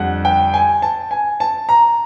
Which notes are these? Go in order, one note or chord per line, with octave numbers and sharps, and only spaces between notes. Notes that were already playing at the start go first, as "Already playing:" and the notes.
Already playing: F2 D3 G3 F#5
G5
G#5
A5
G#5
A5
A#5